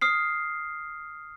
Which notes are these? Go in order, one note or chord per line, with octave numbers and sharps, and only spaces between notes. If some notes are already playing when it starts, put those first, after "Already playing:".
D#6 F6 C7